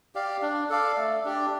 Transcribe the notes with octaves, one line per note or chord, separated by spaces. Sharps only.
G4 D5 F5
D4
A4 D5 F5
A3
D4 G4 D5